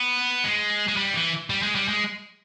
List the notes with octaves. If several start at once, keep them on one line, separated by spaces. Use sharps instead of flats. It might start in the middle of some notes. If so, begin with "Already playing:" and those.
Already playing: B3
G#3
G#3
G3
E3
G3
G#3
G3
G#3